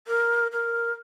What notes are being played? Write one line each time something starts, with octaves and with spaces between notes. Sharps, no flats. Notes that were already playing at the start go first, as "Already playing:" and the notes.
A#4
A#4